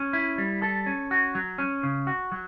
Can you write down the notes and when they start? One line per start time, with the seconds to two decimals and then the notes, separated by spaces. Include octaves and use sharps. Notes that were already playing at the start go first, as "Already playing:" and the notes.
Already playing: C#4
0.13 E4
0.38 G3
0.62 A4
0.86 C#4
1.11 F#4
1.35 F#3
1.58 C#4
1.83 C#3
2.07 F#4
2.32 F#3